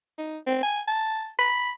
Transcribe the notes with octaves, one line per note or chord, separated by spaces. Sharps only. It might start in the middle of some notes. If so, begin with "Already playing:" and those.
D#4
C4
G#5
A5
B5